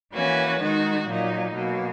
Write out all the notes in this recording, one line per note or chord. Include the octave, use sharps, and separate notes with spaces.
E3 A#3 C#4 F#4 B4
D#3 G#3 D#4 F#4
A#2 F#3 A#3 D#4
B2 F#3 A#3